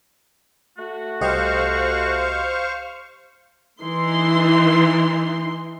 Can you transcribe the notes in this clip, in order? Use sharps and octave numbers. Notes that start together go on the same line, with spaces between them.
A3 F#4
C2 G4 C5 D#5 F5 C#6
E3 D#4 C6